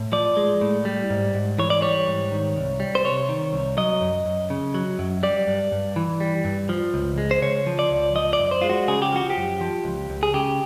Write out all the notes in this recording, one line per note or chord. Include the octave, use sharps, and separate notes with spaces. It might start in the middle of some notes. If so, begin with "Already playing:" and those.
Already playing: A2
F3 D5
G#3
A2
G3
G#2
G#2
E3 C#5
D5
G3 C#5
G#2
D#3
C2
G3
C5
C3 C#5
D#3
C2
F#3 D#5
F#2
F#2
C#3
F#3
F#2
G3 D5
G2
G2
E3
G3
G2
F3
C#2
G#3
C5
C#3 C#5
F3
D5
C#2
F3 D#5
D5
F#2
C5
G#3 F4
F#4
C#3 G#4
G4
F3 F#4
G4
F#2
F3
C#2
C#2
G#4
C#3 G4